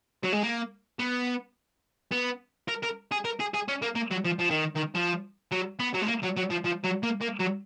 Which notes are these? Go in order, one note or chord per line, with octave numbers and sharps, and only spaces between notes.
F#3
G#3
A#3
B3
B3
A#4
A#4
G#4
A#4
G#4
G#4
C#4
A#3
A#3
F#3
F3
F3
D#3
D#3
F3
F#3
B3
F#3
G#3
A#3
F#3
F#3
F3
F3
F#3
A#3
A#3
F#3